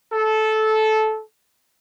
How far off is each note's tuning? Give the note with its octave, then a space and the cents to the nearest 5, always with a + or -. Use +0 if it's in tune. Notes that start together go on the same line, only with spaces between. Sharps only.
A4 -15